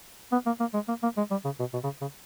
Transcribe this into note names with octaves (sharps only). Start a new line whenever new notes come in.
B3
A#3
A#3
G#3
A#3
A#3
G#3
G3
C#3
B2
B2
C#3
C#3